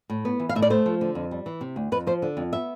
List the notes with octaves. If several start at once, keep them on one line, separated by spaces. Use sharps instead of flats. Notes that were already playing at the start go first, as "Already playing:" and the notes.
A2
B3
E3
F5
A2 E5
D5
A3 C5
F3
D3
F2
G3
E3
C3
D2
F2 B4
F3 C5
D3
F2
B3 E5